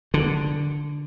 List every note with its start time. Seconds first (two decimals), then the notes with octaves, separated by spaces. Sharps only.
0.14 D3